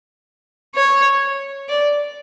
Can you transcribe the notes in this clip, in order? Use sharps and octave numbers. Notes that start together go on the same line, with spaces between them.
C#5
D5